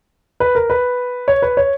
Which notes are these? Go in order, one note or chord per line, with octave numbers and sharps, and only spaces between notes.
B4
A#4
B4
C#5
B4
C#5